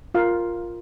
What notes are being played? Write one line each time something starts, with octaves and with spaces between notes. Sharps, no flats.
F4 A#4 F5